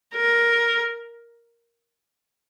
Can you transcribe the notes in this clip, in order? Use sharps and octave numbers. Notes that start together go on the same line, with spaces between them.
A#4